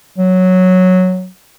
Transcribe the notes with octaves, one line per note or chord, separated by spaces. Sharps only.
F#3